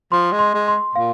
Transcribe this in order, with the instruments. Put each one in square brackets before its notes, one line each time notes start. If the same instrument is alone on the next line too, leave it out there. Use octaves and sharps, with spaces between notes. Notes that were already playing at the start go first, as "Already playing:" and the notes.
[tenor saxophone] F3 [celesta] C6
[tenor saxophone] G#3
[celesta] C6
[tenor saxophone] G#3
[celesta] C6
[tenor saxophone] A#2 [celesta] F5